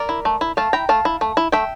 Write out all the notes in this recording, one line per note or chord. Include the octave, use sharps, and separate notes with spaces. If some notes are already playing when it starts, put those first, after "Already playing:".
Already playing: A#4 D5
E4
A3
E4
A3 F5 A5
E4 G5 A#5
A3 F5 A5
E4
A3
E4
A3 E5 G5